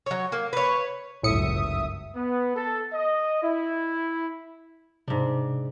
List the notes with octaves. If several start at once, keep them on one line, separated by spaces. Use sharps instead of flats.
F#3 C#5
A#3
B4 C#5
G1 C#2 F#2 A2 E5 D#6 C#7
B3
A4
D#5
E4
G#2 C3 D4